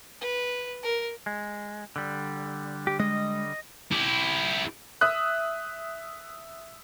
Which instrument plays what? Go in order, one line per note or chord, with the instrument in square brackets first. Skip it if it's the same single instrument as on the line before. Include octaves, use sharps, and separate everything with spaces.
[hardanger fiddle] B4
A#4
[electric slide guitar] G#3
D3 G3
[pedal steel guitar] G4
[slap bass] G#3 [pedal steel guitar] D#5
[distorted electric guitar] E4 G4
[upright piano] E5 D#6 F#6